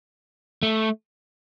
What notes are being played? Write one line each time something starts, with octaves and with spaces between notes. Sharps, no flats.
A3